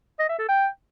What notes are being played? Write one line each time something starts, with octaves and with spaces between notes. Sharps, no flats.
D#5
E5
A4
G5